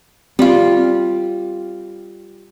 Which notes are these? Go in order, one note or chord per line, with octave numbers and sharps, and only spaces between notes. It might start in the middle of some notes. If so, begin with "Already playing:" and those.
G3 C4 F4